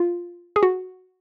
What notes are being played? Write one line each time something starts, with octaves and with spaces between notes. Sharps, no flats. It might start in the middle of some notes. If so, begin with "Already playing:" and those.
Already playing: F4
G#4
F#4